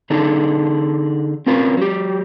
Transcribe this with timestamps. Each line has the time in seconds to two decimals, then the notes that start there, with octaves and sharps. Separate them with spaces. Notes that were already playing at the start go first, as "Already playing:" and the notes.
0.10 D3 D4 D#4 G#4 A4
1.46 C4 C#4 F4 A#4 B4
1.77 F#3 G4